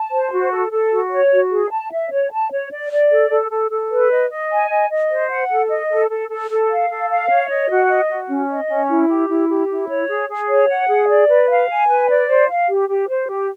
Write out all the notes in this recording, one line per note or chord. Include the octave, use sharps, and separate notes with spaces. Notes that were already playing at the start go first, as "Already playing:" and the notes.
Already playing: A5
C5
F#4
A4
A4
F#4
C#5
F#4
G#4
A5
E5
C#5
A5
C#5
D5
D5
A4
A4
A4
A4
B4
D#5
D#5
G#5
D#5
D#5
C5
F#5
A4
D#5
A4
A4
A4
A4
F5
A4
F5
C#5
D#5
F#4
D#5
F#4
C#4
D#5
C#4
E4
G4
E4
G4
E4
C#5
G#4
G#4
C#5
F#5
G#4
D5
B4
F5
G#5
B4
D5
C5
F5
G4
G4
C5
G4